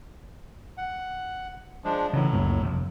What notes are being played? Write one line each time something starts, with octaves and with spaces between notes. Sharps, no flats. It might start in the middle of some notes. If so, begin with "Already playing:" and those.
F#5
F3 G#3 D4
A2 C#3 E3 F#3
C#2 F#2 A#3
F1